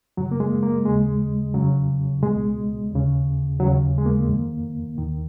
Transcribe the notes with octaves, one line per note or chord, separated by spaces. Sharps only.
F#2 C#3 F#3
A#3
G#3
A#3
D#2 C#3 G#3
F2 C#3 F#3
C#2 B2 G#3
D#2 C#3
D#2 C#3 F#3
G#3
A#3
F2 D#3
D#2 D#3